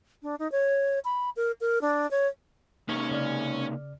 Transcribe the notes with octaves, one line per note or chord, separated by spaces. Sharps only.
D4
D#4
C#5
B5
A#4
A#4
D4
C#5
C3 A#3 C#4 D#4 C#5
C#3 D5 F6